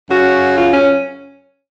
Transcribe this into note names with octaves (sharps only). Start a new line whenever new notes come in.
F#2 C#3 F#4
F4
C#4